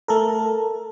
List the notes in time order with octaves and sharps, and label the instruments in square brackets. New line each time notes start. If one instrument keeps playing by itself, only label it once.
[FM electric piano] A3 A4 A#4